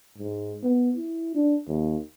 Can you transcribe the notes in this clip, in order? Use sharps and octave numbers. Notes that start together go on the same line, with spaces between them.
G#2
B3
E4
D4
D#2